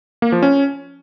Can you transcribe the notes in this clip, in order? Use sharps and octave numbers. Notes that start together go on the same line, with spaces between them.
A#3
F3
C#4